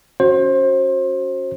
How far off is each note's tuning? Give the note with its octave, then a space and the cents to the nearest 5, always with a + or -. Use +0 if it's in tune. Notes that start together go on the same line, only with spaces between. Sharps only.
C#4 +0 F#4 +0 C5 +25